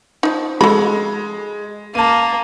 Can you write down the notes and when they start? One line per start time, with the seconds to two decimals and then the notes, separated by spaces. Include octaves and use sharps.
0.23 F3 D#4
0.61 G#3 A4 B5
1.95 A#3 A5 D#7